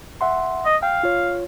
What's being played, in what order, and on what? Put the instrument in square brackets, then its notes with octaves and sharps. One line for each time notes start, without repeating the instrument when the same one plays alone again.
[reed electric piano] E5 F#5 C6
[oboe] D#5
[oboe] F5 [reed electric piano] G5
[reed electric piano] F4 C#5